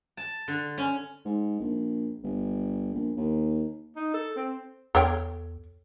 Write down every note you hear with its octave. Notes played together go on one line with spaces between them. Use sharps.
A5
D3
C#4
G#2
A#1
G1
A#1
D#2
D#4
A4
C4
E2 A4 C#5 G5